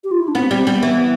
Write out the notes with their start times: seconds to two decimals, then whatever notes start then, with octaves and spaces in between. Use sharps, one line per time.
0.04 G4
0.11 F4
0.20 E4
0.28 D4
0.35 B3 C4
0.51 G3 C4
0.67 G3 B3
0.83 E3